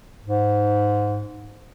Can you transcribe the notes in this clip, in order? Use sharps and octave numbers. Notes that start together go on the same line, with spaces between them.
G#2